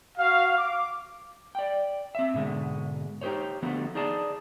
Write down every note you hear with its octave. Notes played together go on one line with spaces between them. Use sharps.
F#4 F5
D6
D5 G5
C4 E5
G#2 B2 D3 G#3
D#4 G4 G#4 C5 C#5
D3 F3 F#3 A3 B3
D#4 G#4 D5 D#5 A5